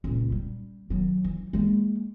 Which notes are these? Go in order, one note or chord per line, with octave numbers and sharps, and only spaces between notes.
C#2 A#2
G3
D#3 F#3
E3
G#3 A#3